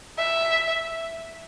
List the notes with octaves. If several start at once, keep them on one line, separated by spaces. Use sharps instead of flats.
E5